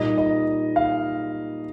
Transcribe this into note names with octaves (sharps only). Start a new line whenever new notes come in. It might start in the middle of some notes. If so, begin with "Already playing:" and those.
Already playing: A#2 G3 A#3 D#4 D#5
D#5
F5